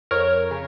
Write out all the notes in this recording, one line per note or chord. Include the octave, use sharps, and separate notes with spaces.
F2 A#4 C#5
C#3